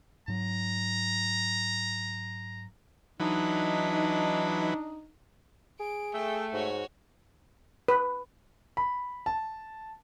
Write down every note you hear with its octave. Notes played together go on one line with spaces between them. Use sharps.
G#2 F#3 A#5
E3 F#3 D4 D#4 B4
G#4 D7
A3 G5
G#2 F#4 C#5
B4
B5
A5